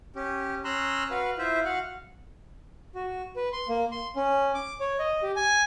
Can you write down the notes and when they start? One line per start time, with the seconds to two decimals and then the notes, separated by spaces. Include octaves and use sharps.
0.16 C#4 G4
0.65 C#4 A#5 C6 E6 F#6
1.10 F#4 B4 F5
1.38 E4 F4 C5 E5
1.65 F#4 F5 F#5
2.95 F#4
3.36 B4
3.53 C6
3.69 A#3
3.92 C6
4.16 C#4
4.54 D6
4.80 C#5
4.99 D#5
5.23 G4
5.36 G#5